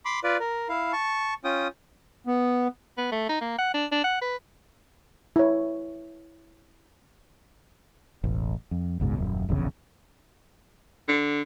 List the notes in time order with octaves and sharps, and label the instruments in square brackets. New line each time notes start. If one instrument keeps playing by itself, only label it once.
[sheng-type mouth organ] B5 C6 D6
F4 B4 D5
A#4
E4 F5
A5 C#6
C#4 F4 G5 D#6
[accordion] B3
[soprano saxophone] B3
A3
D#4
A#3
F#5
D4
D4
F#5
B4
[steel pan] E4 C#5
[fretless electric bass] E1 A1
F2
F#1 C#2 G#2 B2
D#1 F#2
F1 A#1 E2 C#3
[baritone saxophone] D3